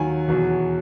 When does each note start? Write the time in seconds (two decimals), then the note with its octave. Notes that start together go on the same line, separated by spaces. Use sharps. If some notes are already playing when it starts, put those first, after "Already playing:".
Already playing: D#2 D#3 F#3 G#5
0.28 E2 B2 F#3